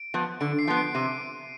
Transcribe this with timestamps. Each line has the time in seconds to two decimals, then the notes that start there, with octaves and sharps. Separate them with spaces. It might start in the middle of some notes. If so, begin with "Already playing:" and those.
Already playing: D7
0.14 F3 B3
0.41 D3 D7
0.59 C7
0.67 F3 B3
0.77 D7
0.94 C3 D#7